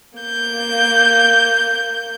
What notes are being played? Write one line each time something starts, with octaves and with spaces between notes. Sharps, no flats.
A#3 G6